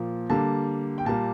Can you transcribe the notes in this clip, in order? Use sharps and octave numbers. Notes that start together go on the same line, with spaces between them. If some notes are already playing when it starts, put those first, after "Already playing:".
Already playing: A#2 F3 A#3
D3 G3 A#3 A5
G5
A#2 G3 A#3 A5